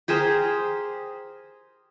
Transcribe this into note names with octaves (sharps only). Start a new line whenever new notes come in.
G4 G#4 A#4 C5